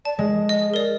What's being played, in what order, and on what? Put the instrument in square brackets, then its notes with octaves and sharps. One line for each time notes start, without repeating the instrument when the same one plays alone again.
[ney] D5 [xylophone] A5
[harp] G#3 [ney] G#4
[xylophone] D#5
A#4 D5